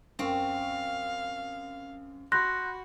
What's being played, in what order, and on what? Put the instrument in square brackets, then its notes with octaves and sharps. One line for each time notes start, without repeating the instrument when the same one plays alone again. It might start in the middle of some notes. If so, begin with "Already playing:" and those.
[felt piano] F#2 C#6 [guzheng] C4 [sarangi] F5
[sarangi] F#4 [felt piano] B5 G6 [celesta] C6 F#6 A#6